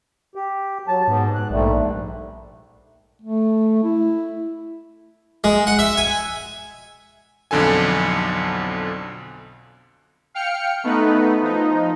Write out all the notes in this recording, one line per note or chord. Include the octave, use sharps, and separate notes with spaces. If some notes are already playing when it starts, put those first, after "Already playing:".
G4
F#3 A5
G#2 B3
F#6
A#1 G#2 G3 A3
A3
E4
G#3
F#5
E5
G#5
B1 F2 D3 A4 G#5
F5 G5 F6 C#7
A3 B3 D#4 B4
F3 D#4